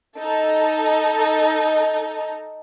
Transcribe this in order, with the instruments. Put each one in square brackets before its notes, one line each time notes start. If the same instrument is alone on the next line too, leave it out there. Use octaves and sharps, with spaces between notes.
[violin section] D#4 A4